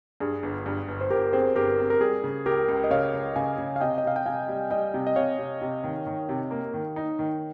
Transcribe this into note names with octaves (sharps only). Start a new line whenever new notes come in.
G2 G#4
G1
G2
G1
C5
G1 G4 A#4
C4 G#4 C5
G1 G4 A#4
C4
A#4
G3 G#4
C#3
C#2 G4 A#4
C#2
D#5
C#3 C#5 F5
C#2
C#3 F5 G#5
C#3
F5
C3 D#5 G5
D#5
C3 F5
G5
C3 F5 G#5
G3
G3 D#5 G5
C3
D#5
C3 C#5 F5
C3
C3
D#3
D#3
C3
A#3
D#3
D#4
D#3